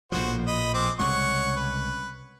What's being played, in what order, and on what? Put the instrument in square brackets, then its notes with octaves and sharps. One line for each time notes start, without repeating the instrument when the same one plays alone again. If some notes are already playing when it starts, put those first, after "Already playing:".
[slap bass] A#1 A2 F3 [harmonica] F#4 C5
[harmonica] D#5 B5
G#3 C4 D6
[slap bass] C2 C#3 G#3 [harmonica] C#5 F#5 C#6
[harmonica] B4